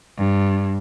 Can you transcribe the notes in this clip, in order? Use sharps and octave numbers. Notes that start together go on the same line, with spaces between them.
G2